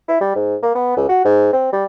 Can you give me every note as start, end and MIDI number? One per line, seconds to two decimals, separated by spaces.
0.08 0.20 64
0.21 0.32 55
0.36 0.56 44
0.63 0.71 58
0.75 0.94 59
0.97 1.09 37
1.09 1.24 66
1.25 1.49 44
1.53 1.70 60
1.72 1.85 55